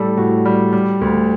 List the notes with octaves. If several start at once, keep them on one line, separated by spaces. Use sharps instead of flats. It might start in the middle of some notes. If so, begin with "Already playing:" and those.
Already playing: A2 G3 A4
A2 F#4
G3
G3
D2